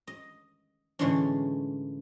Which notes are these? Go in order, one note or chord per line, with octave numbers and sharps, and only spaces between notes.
D#5
A2 D3 E3 G#3 C#4 D4